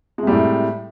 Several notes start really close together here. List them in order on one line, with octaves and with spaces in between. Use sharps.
G#3 C3 G3 A2